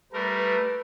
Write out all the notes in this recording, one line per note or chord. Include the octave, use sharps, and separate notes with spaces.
G3 A3 A#4 B4